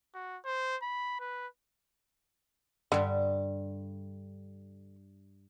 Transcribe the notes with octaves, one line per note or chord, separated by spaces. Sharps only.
F#4
C5
B5
B4
G2 D3 G3